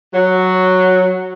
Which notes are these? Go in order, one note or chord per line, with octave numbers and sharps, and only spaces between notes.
F#3